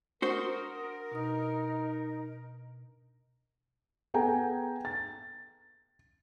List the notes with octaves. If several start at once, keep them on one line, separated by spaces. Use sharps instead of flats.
D4 F#4 A#4 C5 D#6
B2 D#4 D#6
B3 G#4 A4 G5 G#5 A#5
A6